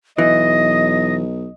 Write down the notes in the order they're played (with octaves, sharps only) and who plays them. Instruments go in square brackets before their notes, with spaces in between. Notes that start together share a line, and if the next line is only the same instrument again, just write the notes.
[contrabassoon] B1 [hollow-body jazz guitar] E3 [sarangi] D#5 [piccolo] A#6